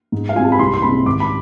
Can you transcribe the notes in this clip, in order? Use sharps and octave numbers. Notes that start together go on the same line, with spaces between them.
G#2
F5
G#3 C4 F4 G#5
A5
B5
C2 C6
C6
C3 G#3 C4 B5
G#1 D6
B5